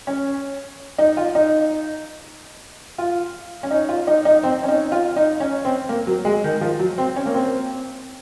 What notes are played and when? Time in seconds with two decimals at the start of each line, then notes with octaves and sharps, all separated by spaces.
0.07 C#4
0.98 D#4
1.17 F4
1.35 D#4
2.98 F4
3.63 C#4
3.71 D#4
3.89 F4
4.07 D#4
4.25 D#4
4.43 C4
4.63 C#4
4.68 D#4
4.92 F4
5.16 D#4
5.40 C#4
5.65 C4
5.89 A#3
6.07 F#3
6.25 G#3
6.44 D#3
6.61 F3
6.79 F#3
6.98 C4
7.16 C#4
7.26 A#3
7.34 C4